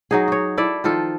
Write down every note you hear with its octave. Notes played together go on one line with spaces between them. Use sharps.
F#3 D#4 G#4
F#4 C#5
E4 A4 D5 E5
D#3 F3 F4 A4